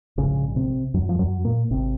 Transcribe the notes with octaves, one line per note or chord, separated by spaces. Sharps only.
A#1 G#2 C#3 C#4
C3 C4
F#2 F#3
F3
F#2 F#3
A#2 A#3
G#1 C3 C4